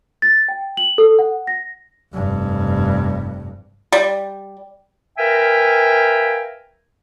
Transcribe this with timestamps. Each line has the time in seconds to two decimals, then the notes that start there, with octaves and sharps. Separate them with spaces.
0.22 A6
0.49 G5
0.77 F#7
0.98 A4
1.19 F#5
1.47 A#6
2.14 F1 G2
3.92 G3
5.18 A#4 B4 E5 F5 G5 G#5